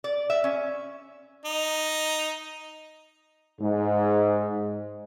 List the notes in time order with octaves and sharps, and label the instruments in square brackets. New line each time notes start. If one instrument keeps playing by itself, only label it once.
[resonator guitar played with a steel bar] D5
E5
C#4
[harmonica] D#4
[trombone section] G#2